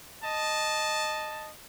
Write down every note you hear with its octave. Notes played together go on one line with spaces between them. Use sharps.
D#5 A5